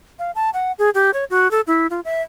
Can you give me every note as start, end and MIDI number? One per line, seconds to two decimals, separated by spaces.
0.19 0.31 77
0.35 0.50 81
0.54 0.72 78
0.79 0.90 68
0.95 1.11 67
1.14 1.25 73
1.30 1.51 66
1.51 1.61 69
1.67 1.87 64
1.90 2.00 65
2.05 2.22 76